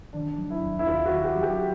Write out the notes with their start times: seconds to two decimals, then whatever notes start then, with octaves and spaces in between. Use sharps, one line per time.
0.13 D#3 D4
0.38 F#3
0.50 E4
0.62 D#2
0.79 E4
0.87 D#2 F4
1.06 F#4
1.11 D#3
1.24 G4
1.35 F#3
1.43 G4